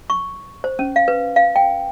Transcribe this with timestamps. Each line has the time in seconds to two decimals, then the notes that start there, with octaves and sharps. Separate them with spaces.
0.10 C#6
0.64 C5
0.79 C#4
0.96 F5
1.08 B4
1.36 F5
1.56 G5